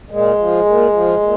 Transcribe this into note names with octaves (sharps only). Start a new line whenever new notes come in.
A#2 G#3
F3
A#2
F3
A#2